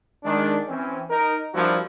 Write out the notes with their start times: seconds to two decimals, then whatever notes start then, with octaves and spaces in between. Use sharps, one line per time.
0.24 D#3 G#3 D4
0.68 E3 C4 C#4
1.10 D#4 A#4
1.54 F3 G3 A#3 D4 E4 F#4